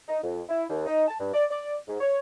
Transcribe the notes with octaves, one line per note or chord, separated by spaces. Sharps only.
D#4
F2
E4
D#2
D#4
A5
G2
D5
D5
G#2
C#5